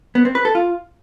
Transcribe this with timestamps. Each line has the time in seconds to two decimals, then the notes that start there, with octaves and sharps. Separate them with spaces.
0.15 B3
0.25 C4
0.35 B4
0.45 A4
0.55 F4